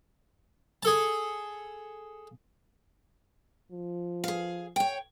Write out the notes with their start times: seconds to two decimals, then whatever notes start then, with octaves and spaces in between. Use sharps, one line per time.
0.83 G#4 A4 A5
3.72 F3
4.24 G#4 F5
4.76 C#5 G5